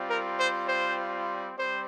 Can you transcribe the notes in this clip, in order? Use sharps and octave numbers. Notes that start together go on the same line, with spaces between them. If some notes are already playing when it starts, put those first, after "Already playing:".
Already playing: G3 C4 F4
A#4
C5
C5
G3 C4 C5